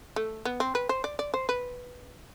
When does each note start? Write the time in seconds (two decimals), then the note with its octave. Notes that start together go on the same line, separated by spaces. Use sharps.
0.16 A3
0.45 B3
0.60 C4
0.75 B4
0.89 C5
1.04 D5
1.19 D5
1.34 C5
1.49 B4